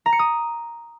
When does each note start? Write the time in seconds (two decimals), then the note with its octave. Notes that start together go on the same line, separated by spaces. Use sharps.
0.06 A#5
0.13 C#7
0.19 D#6